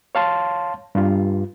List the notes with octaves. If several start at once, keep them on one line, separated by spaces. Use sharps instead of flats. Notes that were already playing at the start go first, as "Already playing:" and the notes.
C#5 F5 A5 C6
G2 F4